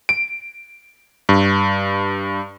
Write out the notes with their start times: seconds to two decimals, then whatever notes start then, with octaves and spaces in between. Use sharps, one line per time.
0.09 D7
1.29 G2